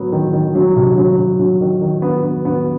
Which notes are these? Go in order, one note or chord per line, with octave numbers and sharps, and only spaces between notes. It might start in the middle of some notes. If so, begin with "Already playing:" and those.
Already playing: F#3 B3
D#3
D#3
F#3
C3
F#3
F#3
F#3
D#3
D#3
B3
B3
B3